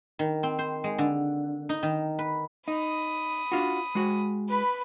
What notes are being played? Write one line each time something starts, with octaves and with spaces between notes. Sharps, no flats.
D#3
C4
C5
G#3
D3
D#4
D#3
B4
D#4 B5 D#6
D4 F4 F#4
G#3 F#4
B4 B5